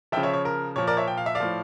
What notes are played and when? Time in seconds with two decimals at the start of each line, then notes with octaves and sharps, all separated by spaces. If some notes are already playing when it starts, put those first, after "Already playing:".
0.12 F3 E5 G5
0.17 C#3
0.23 C#5 E5
0.33 C#5
0.45 A#4
0.76 A#2 F3 C#5
0.87 A#4 D5
0.97 C#5 E5
1.08 G5
1.18 F5
1.26 E5
1.35 D5 F5
1.40 A2 F3